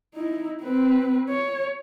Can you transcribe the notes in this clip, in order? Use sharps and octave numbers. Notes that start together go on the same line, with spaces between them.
D#4 E4
C4 B4
C#5